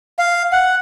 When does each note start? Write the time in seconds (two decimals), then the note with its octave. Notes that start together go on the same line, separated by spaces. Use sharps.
0.19 F5
0.52 F#5